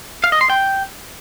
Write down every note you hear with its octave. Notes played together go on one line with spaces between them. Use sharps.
F5
D#5
C6
G5